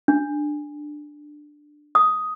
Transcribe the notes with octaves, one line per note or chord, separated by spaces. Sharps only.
D4
D#6